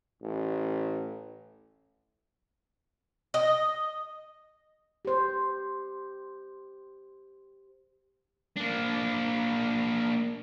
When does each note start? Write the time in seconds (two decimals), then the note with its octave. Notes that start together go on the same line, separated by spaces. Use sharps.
0.22 A1
3.34 D#5
5.05 G4 C5
8.57 A#3 D4